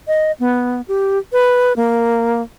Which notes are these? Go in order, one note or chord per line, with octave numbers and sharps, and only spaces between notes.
D#5
B3
G4
B4
A#3